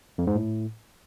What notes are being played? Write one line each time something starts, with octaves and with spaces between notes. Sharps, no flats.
F2
G#2
A2